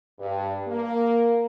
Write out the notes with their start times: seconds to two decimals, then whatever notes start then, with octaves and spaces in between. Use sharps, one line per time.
0.19 G2
0.67 A#3